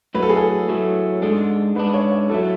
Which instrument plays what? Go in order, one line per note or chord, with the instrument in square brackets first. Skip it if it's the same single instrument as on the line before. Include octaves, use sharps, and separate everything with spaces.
[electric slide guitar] A2 F#3 A3 [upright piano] B4
[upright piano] A4
G#4
A4
[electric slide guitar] A2 F#3 A3
[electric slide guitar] G#2 G#3 D4 [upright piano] A4
[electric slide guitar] G#2 G#3 D4 [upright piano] B4
[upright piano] C#5
C#5
[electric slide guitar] A2 F#3 A3 [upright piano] A4